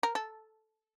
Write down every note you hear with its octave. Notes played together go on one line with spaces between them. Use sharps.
A#4
A4